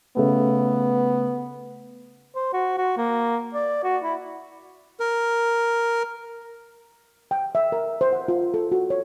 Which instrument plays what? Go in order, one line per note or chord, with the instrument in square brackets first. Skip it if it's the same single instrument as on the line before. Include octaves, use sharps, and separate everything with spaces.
[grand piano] C#3 A3 [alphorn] B3
[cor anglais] C5
F#4
F#4
A#3
D5
F#4
E4
[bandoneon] A#4
[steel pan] G5
E5
A#4
C5
F#5
F4
A4
F#4
C#5